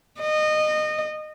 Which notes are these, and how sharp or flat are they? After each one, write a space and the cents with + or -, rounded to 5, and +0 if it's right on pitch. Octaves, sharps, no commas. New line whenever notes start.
D#5 -25